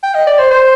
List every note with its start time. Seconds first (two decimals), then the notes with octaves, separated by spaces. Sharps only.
0.03 G5
0.15 D#5
0.27 D5
0.39 C5
0.51 C5